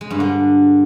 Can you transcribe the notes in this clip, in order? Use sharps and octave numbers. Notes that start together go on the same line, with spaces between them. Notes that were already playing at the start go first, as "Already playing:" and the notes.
G#3
G2
D3